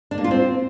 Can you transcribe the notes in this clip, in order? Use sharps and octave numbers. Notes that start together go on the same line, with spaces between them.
D4
A#3
F4
C4